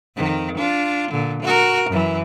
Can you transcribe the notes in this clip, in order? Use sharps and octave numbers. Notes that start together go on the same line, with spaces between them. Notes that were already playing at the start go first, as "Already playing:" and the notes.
F2 D#3
D4 F4
A#2 D3
F#4 A#4
F#2 E3